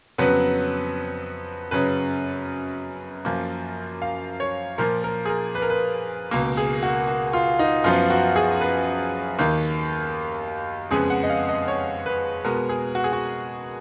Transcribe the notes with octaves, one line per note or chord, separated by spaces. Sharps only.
F2 C#3 F#3 B3 B4
F#2 C#3 F#3 B4
F#2 F3 A#3
F5
C#5
A#2 F3 A#3 A#4
A#4
G#4
A#4
B4
A#4
B4
C#2 B2 A#3 A#4
G#4
F#4
F#4
F4
D#4
F#2 F3 B3 F4
F#4
G#4
B4
D#2 D#3 A#3
F2 C#3 G#3 B3 G#4
F#5
D#5
F5
D#5
C#5
B4
B2 G#3 B3 A#4
G#4
F#4
G#4
F#4